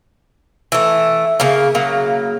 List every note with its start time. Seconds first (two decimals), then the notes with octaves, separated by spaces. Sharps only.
0.72 E3 A3
1.40 C#3 A#3
1.75 C#3 F#3 A#3